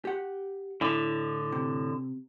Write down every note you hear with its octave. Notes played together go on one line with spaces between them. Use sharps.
G4 F#5
A2 D3 E4 D#5
C3